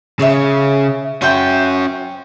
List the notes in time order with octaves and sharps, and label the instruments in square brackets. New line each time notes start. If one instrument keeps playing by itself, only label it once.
[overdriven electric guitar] C#3 [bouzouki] G#4 C#5 E5
[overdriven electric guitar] C#4 F#4 [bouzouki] C5 E5 G5